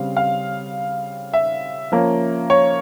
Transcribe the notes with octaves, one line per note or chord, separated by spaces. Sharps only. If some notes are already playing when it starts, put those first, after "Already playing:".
Already playing: C#3 G3 C4 F5
F5
E5
F3 A#3 C#4
C#5